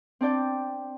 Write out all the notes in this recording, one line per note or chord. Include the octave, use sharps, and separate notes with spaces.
C4 D4 D5 G5